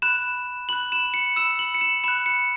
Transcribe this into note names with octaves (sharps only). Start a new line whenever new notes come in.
B5 F#6 E7
B5 F#6 F#7
E7
C#7
B5 E6 E7
F#7
C#7
E7
B5 F#6 E7
C#7